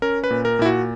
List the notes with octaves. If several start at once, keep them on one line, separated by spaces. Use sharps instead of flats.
C#4 A#4
B4
A#2
A#4
A#2 E4
F#4